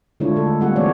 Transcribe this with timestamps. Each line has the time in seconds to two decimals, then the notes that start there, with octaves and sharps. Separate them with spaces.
0.20 D3 G#3 D4 E4 F4 C#5
0.36 D3 A3 A4
0.61 G3 A#3 C4 F4 G#4 F#5
0.76 E3 G#3 C4 C#5 D5